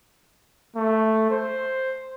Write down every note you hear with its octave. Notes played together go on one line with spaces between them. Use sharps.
A3
C5